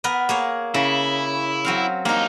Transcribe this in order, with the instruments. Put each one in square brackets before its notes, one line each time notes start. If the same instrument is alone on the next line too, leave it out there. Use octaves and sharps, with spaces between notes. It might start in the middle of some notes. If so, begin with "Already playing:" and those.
[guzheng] B3 A#4 B4
A#3 G#4 C#5
[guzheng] C#3 [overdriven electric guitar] E4
[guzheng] F#3 C4 F5
[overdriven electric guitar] G2 D#4 [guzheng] A#3 A#4